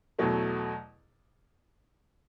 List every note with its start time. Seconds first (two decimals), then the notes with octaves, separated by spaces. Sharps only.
0.18 E2 B2 F#3 A3